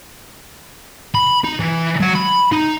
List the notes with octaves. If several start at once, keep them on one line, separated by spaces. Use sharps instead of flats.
B5
D#4
E3
F#3 F#5
B5
D#4